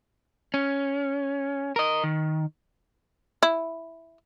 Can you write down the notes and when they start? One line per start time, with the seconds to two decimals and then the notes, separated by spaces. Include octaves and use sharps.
0.54 C#4
1.76 A#4 D#5
2.04 D#3
3.43 E4